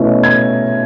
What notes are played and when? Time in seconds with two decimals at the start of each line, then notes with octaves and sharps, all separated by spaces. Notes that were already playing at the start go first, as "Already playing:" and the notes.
Already playing: B2 A3 C#4 E4
0.23 G#6